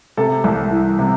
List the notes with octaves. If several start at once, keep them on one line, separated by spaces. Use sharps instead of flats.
C3 A4
C2
E3
C3